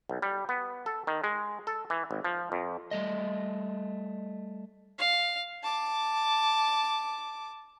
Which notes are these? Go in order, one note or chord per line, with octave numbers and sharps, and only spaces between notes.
B1
G3
B3
A4
D#3
G#3
A4
E3
G#1
F3
F2
G3 A3 D#5
F5
A5 D6